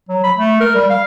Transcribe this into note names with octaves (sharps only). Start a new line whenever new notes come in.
F#3
B5
A3
A#4
G3
F5